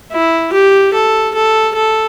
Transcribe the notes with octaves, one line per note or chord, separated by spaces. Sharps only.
E4
G4
A4
A4
A4